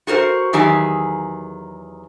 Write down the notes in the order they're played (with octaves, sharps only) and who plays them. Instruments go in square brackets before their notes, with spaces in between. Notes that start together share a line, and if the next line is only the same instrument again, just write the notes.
[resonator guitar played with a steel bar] F#4 G#4 A#4 C5
E2 D#3 F#3 G4 G#4 G#5